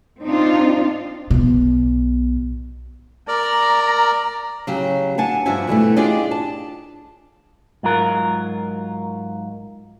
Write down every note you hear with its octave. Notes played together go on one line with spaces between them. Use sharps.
C4 D4 D#4 F4
B1 B2
A#4 D5 A#5
C#3 F#3 G4
D4 F#5 G#5 A5
G2 F3 D4 F#4 E5 G#5
B2 E3 G3 A3
D4 F4 G4 G#4 D5 D#5
A5
G#2 F#3 F4 A#4